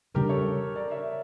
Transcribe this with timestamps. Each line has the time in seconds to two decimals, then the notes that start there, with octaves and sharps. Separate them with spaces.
0.14 E2 C#3 G3 D4 G4 A#4
0.29 A4 C#5
0.76 A#4 D5
0.91 C#5 E5